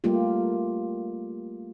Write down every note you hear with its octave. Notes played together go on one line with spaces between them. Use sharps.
G3 A3 A#3 F4 G4